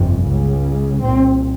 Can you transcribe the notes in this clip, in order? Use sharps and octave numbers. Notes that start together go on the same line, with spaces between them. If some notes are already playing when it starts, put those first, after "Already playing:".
Already playing: G1 F2 C3
C#2 C#3
C2 A#2 C4